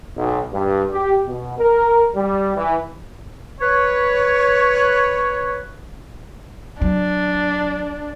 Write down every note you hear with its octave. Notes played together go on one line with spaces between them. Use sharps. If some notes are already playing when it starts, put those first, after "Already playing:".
B1
G2
G4
B2
A#4
G3
E3
B4 C#5
F#3 D4